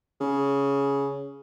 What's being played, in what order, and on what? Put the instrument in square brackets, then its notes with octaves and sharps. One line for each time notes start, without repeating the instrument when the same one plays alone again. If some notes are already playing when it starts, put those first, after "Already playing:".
[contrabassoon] C#3